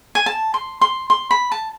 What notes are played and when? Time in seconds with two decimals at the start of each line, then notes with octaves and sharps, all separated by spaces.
0.15 G#5
0.26 A5
0.54 C6
0.81 C6
1.10 C6
1.31 B5
1.52 A5